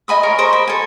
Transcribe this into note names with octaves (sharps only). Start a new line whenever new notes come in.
D#5 G#5 B5 D#6
A#4 C#5
A#4 C5 D#5 C#6
B5
A4 G#5